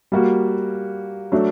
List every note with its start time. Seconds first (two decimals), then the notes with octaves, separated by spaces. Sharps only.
0.12 G3 A#3 F#4
1.32 F#3 A3 D4